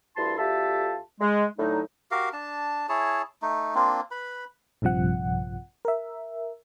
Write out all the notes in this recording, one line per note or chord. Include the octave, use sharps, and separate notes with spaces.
D2 G2 E4 A5 C6
D2 F4 G4 A4 E5 A5
G#3
A2 D3 F#3 A3 D#4
F#4 G4 A#4 F5
D4 A5
E4 G#4 C#5 A5
A3 D#4
A#3 C4 D4 F4
B4 B5
A#1 G2 C3 F3 F#5
A#4 E5